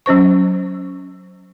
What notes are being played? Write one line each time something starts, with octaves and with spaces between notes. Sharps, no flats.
F#3 C#4 C5 C#6